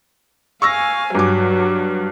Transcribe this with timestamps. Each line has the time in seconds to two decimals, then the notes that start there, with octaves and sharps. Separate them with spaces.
0.62 F5 G#5 C#6 E6 A#6
1.15 G2 F#3 D6